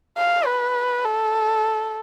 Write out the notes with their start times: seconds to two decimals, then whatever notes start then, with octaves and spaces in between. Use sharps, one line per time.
0.18 F5
0.46 B4
1.05 A4